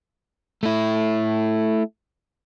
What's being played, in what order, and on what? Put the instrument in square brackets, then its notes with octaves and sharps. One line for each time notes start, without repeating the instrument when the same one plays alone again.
[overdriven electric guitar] A3 E4